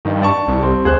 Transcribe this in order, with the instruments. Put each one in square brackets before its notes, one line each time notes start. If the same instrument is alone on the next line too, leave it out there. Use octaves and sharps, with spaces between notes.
[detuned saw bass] G2 [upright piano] D#3
[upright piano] D5 A5 C#6
[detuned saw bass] C2
[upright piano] G3 C4
[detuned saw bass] D2 [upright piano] G#4 C5 F#6